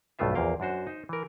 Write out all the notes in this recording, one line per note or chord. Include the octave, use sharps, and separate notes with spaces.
B1 G2 A3 B3 F4 E5
A#1 E2 A#2 A#3 F5 G5
F#2 D4 F#4 C5
D#4 C5
E3 A#4